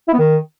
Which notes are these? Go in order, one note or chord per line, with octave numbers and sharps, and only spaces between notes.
E4
B3
D#3